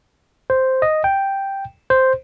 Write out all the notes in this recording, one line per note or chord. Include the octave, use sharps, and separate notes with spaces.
C5
D#5
G5
C5